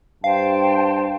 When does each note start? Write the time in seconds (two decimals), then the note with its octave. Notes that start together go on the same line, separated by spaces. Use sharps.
0.24 G2 C5 F5 G5 A5